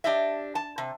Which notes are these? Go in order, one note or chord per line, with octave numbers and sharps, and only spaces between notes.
D4 G4 D#5 E5
A5
C3